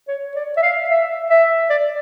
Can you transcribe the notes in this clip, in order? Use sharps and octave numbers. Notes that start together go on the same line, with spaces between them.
C#5
D5
E5
F5
E5
E5
D5